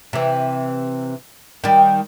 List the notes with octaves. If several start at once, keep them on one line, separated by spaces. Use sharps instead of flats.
C3 E3
D#3 G3